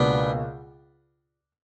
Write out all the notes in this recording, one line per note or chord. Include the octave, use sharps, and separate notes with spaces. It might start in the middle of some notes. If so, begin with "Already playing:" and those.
Already playing: C#2 B2 A#3 B3 D4